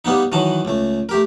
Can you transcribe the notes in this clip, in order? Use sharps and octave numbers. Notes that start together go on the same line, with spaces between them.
G3 A#3 B3 D#4
D#3 E3 F#3 A5 A#5
C#2 A3
A3 G4 A#4